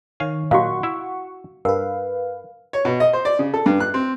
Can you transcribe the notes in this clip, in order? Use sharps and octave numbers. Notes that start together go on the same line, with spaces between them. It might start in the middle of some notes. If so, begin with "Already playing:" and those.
D#3 C#5 F5 G#5
A#2 D#3 F#3 F#4 F5 F#5 C#6
E4 E5
G2 A#4 B4 F5
C#5
B2
D#5
C5
D5
C#3
A4
G2
F#6
C4